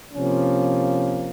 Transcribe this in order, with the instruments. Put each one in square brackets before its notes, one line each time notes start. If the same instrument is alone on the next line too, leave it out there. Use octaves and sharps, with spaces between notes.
[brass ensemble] C3 F3 A#3 C#4